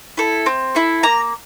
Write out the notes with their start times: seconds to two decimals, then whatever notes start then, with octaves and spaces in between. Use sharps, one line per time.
0.17 E4 A4
0.46 C4
0.75 E4 A4
1.03 A#3 A#5